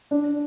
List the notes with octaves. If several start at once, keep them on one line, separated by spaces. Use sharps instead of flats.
D4